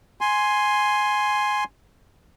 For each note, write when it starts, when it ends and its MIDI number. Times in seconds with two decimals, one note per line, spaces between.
0.21 1.64 80
0.21 1.64 84